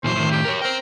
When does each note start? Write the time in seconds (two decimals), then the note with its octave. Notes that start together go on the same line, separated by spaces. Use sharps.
0.04 A#2 E3 F#3 C5
0.16 A2 D#3
0.31 G4
0.45 A#4 B4 C#5
0.62 A#4 C5 G5